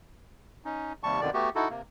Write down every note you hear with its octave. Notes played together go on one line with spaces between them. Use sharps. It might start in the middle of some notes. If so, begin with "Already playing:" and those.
C#4 D#4
D#2 C3 G3 A5 C#6
F2 B2 D3 D#3 D5
A3 B3 F#4 G4
D#4 E4 F#4 A4
C3 A#3